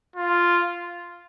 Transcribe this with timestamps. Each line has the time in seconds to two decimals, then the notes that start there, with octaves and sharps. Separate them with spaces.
0.16 F4